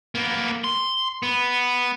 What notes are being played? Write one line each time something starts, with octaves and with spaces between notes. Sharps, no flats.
A#3 B3
C6
B3